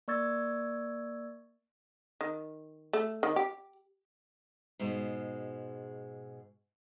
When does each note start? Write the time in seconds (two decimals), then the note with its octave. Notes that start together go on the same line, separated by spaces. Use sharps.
0.08 A#3 D5 C#6 E6 G#6 A6
2.21 D#3
2.93 A3
3.23 D#3
3.36 G4
4.79 G#2 B2 G#3